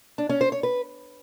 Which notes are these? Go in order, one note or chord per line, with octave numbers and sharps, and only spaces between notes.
D4
C#4
C5
C#5
B4